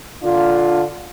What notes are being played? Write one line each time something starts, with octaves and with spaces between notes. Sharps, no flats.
D3 D4 F4